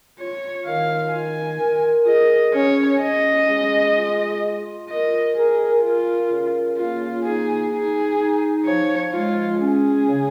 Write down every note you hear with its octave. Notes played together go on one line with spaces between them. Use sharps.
F4 C#5
D#3 F5
F4 G#5
A#4
G#4 D#5
C#4 C#5
C#4 D#5
G#3
F4
F4
A#4 D#5
G#4 A#4
F4 A#4
C#3
A#3 F4
D#4 G#4
D#4 G#4
D#4
F3 C#5
G#3 F4
C#4 G#4
C#3